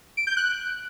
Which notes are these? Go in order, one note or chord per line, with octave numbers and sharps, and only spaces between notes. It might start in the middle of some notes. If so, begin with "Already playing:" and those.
D7
G6
F#6